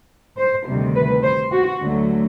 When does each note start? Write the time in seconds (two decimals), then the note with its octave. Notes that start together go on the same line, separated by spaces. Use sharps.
0.37 C5
0.66 D2 C3 D#3 G3
0.94 B4
1.23 C5
1.52 F#4
1.81 D2 D3 F#3 A3